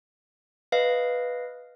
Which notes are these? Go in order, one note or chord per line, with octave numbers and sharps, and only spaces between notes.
B4 D#5 F5